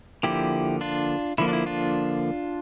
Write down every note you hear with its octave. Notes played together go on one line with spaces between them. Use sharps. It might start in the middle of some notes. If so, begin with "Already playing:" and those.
D3 F3 A#3 E4 G4
D4 F4
D3 F3 A#3 E4
D4
E4
D4 F4